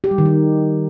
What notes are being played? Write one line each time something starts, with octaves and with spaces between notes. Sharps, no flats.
G4
G3
D#3
D#4